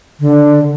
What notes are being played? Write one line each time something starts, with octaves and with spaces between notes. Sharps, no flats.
D3